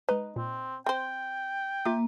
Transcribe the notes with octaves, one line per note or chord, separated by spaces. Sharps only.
G#3 D#4 B4
A#2 C4
C4 C5 G5
A#3 F4 E5 D6